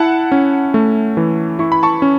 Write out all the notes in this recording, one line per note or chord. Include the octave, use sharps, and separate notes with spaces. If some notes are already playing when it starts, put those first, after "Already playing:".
Already playing: E4 F#5 A5
C#4
A3
E3
E4 C#6
B5
A5 C#6
C#4